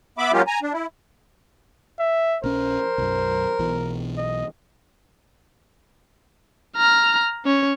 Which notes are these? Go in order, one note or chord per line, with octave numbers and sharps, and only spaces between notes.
B3 E5 B5 D6
F#3 G#3 A#3 C#4 F4 G4
G#5 A#5
D4
E4
E5
A#1 C#4 A#4 C5
B1 F#2
B1 B2 E3
D#5
A#5 F6
C#4 C#5